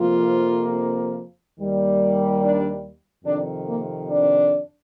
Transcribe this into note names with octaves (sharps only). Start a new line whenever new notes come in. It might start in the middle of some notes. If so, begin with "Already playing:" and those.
Already playing: F2 C3 F3 A#3 F4
D#2 D#3 G3 A#3
D4
F2 C3 D#3 D4
A#3
D4